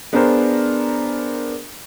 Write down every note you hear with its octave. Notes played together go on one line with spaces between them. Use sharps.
B3 D4 G#4 A#4 C5